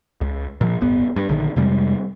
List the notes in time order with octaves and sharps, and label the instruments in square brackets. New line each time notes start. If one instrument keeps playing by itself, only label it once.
[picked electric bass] C#2
A#2 F3
D1 G1 B3
G2
A#1 D3 D#3
F2 C3 G3 G#3